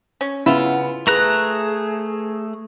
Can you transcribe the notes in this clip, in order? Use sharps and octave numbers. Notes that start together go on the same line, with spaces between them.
C#4
C#3 B3 E4 F4 F#5
A3 G#4 B4 A#5 F#6